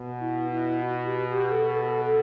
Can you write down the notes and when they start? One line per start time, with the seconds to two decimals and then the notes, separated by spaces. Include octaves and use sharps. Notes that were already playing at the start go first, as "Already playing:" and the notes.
Already playing: B2
0.20 E4
0.51 E4
0.82 F#4
1.06 G4
1.28 G4
1.52 A4
1.75 A4
2.05 A4